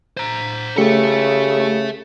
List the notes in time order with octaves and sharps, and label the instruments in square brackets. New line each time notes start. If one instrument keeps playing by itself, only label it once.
[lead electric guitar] C5 A#5
[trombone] C#3 [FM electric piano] A3 G4 C#7 [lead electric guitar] A4 E5